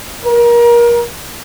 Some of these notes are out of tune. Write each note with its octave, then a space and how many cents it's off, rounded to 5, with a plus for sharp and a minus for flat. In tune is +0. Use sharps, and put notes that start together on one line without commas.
A#4 +30